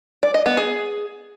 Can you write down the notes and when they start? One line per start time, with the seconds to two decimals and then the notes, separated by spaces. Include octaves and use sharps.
0.23 D5
0.34 D#5
0.46 B3
0.57 G#4